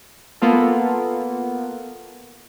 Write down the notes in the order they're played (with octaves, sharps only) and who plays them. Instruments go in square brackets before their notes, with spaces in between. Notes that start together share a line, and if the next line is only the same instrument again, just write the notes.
[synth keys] A#3 B3 F4 A4